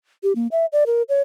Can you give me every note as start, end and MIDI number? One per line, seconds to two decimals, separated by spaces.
0.23 0.33 67
0.35 0.47 58
0.52 0.66 76
0.73 0.84 74
0.86 1.02 70
1.09 1.21 73